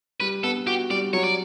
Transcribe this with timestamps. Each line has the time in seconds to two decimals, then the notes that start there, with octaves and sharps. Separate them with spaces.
0.20 G3 B4
0.43 B3 A4
0.66 F#4 G4
0.90 G3 D5
1.13 F#3 C#5
1.24 D5